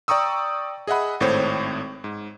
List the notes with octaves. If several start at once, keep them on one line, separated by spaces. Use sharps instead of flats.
D5 G5 A#5 C#6 D#6 E6
G#4 D#5 E5 F#5 B5
G#1 A2 C4 C5 C#5
G#2